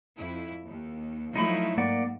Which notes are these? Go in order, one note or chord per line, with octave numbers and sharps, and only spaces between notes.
F2 E4
D#2
F3 F#3 A3 D#4 E4 B5
G#2 A#3 D5 F#5